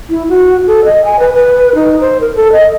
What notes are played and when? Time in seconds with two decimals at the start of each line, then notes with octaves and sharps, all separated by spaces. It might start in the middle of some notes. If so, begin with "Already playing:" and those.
0.09 E4
0.29 F#4
0.67 A4
0.84 D#5
1.05 G#5
1.19 B4
1.34 B4
1.75 D#4
2.00 C5
2.21 A#4
2.36 A4
2.52 D#5